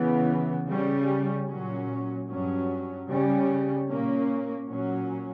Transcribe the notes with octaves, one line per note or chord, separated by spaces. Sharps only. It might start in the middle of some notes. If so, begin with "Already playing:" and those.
Already playing: C#3 E3 B3
C#3 G3 C#4
A#2 F#3 C#4
G2 F#3 C#4
C#3 G3 C#4
A#2 A#3 C#4
A#2 F#3 C#4